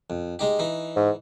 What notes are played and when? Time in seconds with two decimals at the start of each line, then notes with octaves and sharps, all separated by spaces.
0.10 F2
0.39 G#3 D#4 G4
0.59 E3 D#4
0.96 G#2